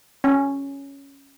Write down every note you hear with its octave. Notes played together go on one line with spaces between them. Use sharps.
C#4